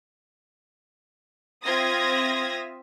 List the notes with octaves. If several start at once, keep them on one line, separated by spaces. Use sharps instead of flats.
C4 F4 E5 D#6 G#6 A#6